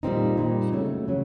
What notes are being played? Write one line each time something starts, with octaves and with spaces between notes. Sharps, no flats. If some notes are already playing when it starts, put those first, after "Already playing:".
A#2 G3 C4 D#4
A#2 G3 C4 D#4
C#3 F#3 A3
C#3 F#3